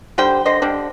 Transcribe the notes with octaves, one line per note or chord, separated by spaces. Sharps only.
D3 G3 C5 G5
D3 C5 D#5
D3 G3 D4